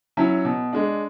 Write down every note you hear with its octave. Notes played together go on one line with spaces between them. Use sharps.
F#3 C#4 E4
B2
G#3 D4